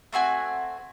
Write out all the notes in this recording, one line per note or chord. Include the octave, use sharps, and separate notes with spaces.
A3 C4 F#4 G#5